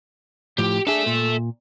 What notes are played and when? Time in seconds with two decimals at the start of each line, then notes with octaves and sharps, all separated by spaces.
0.59 A2 F3 G4
0.87 D4 G#4 A4 E5
1.06 A#2